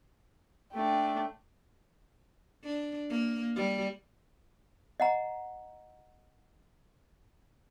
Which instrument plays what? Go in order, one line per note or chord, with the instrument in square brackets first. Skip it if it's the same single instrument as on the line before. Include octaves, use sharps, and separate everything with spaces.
[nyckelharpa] A3 D4 [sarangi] G5
[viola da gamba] D4
A#3
G3
[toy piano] D#5 F#5 A#5